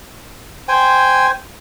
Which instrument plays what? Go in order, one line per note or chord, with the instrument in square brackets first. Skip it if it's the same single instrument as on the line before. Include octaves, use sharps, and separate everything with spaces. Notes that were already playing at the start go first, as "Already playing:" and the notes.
[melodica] C5 G5 G#5